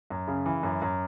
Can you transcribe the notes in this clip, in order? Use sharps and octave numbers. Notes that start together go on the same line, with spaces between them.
F#2
C#3
E3
F#2
F#2